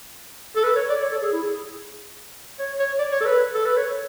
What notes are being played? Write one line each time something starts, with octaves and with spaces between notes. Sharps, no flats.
A4
B4
C#5
D5
C#5
A4
G#4
E4
G#4
C#5
C#5
D5
C#5
A4
B4
A4
B4
C#5